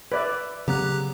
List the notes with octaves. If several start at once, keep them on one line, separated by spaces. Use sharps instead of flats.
B4 D5 E5
C#3 F#3 B3 G4 A#5 F#6